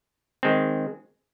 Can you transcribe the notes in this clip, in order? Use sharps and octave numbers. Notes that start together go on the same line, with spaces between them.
D#3 G#3 C4